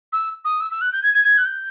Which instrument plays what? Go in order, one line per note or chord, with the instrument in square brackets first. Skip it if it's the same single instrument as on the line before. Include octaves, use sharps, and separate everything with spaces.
[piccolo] E6
D#6
E6
E6
F#6
G6
G#6
G#6
G#6
F#6
G6